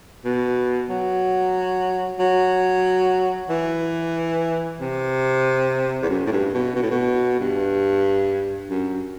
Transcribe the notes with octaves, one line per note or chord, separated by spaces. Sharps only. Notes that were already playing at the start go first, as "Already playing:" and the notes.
B2
F#3
F#3
E3
C3
E2
F#2
A2
G2
B2
B2
A2
B2
G2
F#2